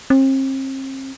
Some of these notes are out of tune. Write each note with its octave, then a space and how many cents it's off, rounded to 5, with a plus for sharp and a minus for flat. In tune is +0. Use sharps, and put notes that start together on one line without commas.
C4 +40